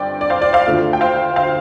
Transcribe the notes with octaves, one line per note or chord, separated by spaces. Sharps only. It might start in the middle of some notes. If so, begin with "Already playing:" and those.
Already playing: G2 D3 C4 D5 G5
D5
C5 F5
D5
C5 F5
D2 D3 A3 F4
G5
C5 F5
C5 F5